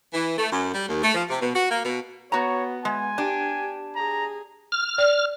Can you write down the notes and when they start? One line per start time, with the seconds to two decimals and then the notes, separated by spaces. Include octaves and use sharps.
0.13 E3
0.37 A3
0.51 F#2
0.74 G3
0.89 D#2
1.02 A3
1.14 F3
1.29 C3
1.41 B2
1.53 F#4
1.70 A#3
1.84 B2
2.32 B3 F#4 C#5 A#5
2.85 G#3 G#5
3.18 D4 G4
3.96 G#4 A#5
4.72 F6
4.98 D5